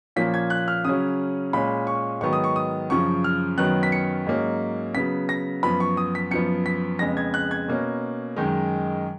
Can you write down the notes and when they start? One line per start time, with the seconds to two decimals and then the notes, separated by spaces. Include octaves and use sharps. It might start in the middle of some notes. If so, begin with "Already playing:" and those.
0.16 A#2 F3 A#3 C#4 B6
0.34 G#6
0.50 F#6
0.68 F6
0.85 C#3 F#3 C#4 D#6
1.53 A#2 G#3 C#4 B5
1.87 C#6
2.21 G#2 D#3 F#3 B3 C#6
2.33 D#6
2.44 C#6
2.56 D#6
2.90 F#2 C#3 F3 C#6
3.24 F6
3.58 F#2 D#3 F#3 B3 F#6
3.83 B6
3.92 C#7
4.27 G#2 F#3 A#3 C#4
4.94 C#3 F#3 B3 B6
5.29 A#6
5.63 F#2 F3 B3 B5
5.80 C#6
5.97 D#6
6.15 B6
6.31 F#2 F3 B3 C#7
6.66 B6
6.99 F2 C#3 G#3 B3 A#6
7.17 G#6
7.34 F#6
7.51 G#6
7.68 B2 A#3 C#4
8.37 F#2 D#3 G#3